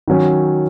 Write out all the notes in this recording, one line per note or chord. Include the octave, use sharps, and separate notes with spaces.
D#3 F#3 C#4